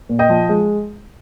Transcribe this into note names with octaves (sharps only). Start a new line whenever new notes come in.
A#2
D#5 G5
F3
G#3